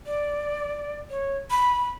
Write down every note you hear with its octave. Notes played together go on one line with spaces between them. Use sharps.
D5
C#5
B5